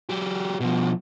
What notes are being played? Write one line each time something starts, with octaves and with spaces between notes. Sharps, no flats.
F#3 G4
B2 F3